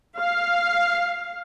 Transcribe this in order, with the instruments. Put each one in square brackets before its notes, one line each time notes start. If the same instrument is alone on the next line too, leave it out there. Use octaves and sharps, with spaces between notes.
[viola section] F5